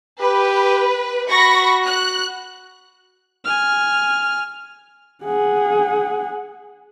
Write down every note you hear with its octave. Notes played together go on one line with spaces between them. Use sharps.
G4 B4
F#4 B5 C#6 A#6
F#6
G#5 F6
G#4 F#5